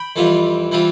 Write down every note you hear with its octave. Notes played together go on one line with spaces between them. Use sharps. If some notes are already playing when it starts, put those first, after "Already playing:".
Already playing: G5 B5
F2 E3 G3 C4 F4
E3 G3 C4 F4